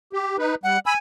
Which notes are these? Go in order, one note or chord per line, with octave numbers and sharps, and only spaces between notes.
G4
D#4 B4
G3 F#5
G#5 B5 E6